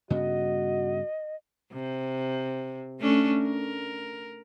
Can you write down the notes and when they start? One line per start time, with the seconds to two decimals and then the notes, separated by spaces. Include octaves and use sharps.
0.10 G2 C#3 B3 F#4 D#5
1.73 C3
3.00 A3 C#4 D4
3.43 A#4